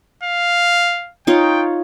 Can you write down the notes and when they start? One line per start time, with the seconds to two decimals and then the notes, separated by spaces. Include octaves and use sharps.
0.23 F5
1.27 D#4 F4 C#5 G5